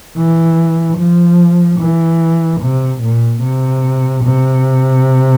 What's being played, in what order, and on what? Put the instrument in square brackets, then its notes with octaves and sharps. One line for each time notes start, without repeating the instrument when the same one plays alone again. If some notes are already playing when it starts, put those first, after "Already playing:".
[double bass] E3
F3
E3
C3
A#2
C3
C3